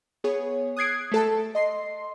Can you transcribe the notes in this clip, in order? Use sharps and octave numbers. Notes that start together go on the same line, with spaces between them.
B3 G#4 C#5
D#6 F#6 G#6 C7 D7
A3 A4 A5
D#5 C6 C7